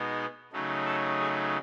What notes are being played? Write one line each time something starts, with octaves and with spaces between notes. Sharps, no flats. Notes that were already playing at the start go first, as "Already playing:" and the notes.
Already playing: B2 G#3 B3 D#4
C#3 F#3 A3 D#4
A4
G#4